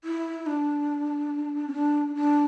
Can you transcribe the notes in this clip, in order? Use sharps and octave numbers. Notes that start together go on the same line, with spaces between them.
E4
D4
C#4
D4
D4